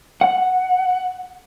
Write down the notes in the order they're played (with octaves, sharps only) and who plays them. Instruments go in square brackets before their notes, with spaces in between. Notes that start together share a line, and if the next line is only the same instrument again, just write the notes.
[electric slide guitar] F#5